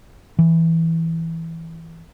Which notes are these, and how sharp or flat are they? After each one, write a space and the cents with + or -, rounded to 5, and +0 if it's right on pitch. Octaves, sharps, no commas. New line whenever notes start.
E3 -5